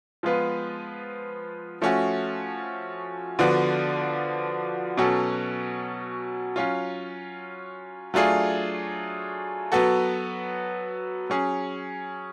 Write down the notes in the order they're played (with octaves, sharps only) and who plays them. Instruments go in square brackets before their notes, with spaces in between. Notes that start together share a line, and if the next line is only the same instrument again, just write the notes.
[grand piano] F3 G#3 B3 F4 B4
F3 A3 C#4 F#4
D3 F3 B3 D4 F#4
B2 F#3 C#4 F#4 A4
F#3 C#4 F4
F#3 A3 D4 F4 G#4
F#3 B3 F#4 A4
F#3 C#4 G#4